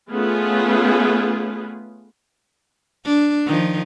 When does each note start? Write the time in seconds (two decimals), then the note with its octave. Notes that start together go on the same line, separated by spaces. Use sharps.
0.11 A3 B3 C#4 F4 G#4 B4
3.05 D4
3.46 D#3 F3